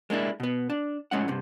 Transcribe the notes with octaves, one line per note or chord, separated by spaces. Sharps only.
G#3 A#3 D4 E4
B2 B3
D4
A2 G#3 C#4 F#5
G2 C3